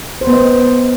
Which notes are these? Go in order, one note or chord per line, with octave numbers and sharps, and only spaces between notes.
C5
B3
D#5